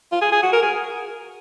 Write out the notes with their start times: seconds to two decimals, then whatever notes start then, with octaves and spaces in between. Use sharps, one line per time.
0.12 F4
0.22 G#4
0.32 G#4
0.43 F#4
0.53 A#4
0.62 G#4